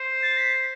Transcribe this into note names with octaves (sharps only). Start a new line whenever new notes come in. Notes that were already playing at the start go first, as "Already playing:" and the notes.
Already playing: C5
A6
B6